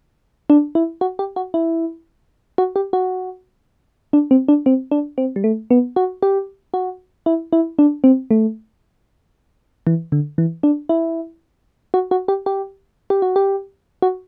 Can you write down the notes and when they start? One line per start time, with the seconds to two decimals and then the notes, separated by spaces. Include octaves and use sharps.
0.50 D4
0.75 E4
1.01 F#4
1.19 G4
1.36 F#4
1.54 E4
2.58 F#4
2.76 G4
2.93 F#4
4.13 D4
4.31 C4
4.48 D4
4.66 C4
4.91 D4
5.18 C4
5.36 G3
5.44 A3
5.71 B3
5.96 F#4
6.23 G4
6.74 F#4
7.26 E4
7.53 E4
7.79 D4
8.04 C4
8.31 A3
9.87 E3
10.12 D3
10.38 E3
10.63 D4
10.89 E4
11.94 F#4
12.11 F#4
12.28 G4
12.46 G4
13.10 G4
13.22 F#4
13.36 G4
14.02 F#4